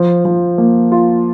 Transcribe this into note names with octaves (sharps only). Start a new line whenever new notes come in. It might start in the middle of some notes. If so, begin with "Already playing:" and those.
Already playing: F3
F3
A#3
F4